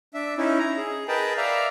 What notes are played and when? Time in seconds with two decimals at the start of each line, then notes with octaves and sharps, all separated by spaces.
0.14 D4 E5
0.38 C#4 D#4 E4
0.59 A#5
0.77 G#4
1.08 G#4 A#4 B4 D#5 G5 A5
1.37 D5 E5 F5 A#5